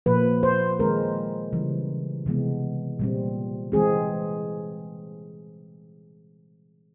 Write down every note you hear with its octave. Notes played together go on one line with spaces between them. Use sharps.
A#2 F3 A#3 B4
C5
D#3 G#3 C4 A#4
C#3 E3 G3
C3 E3 G#3 B3
A#2 G3 C4
E3 G#3 C4 G#4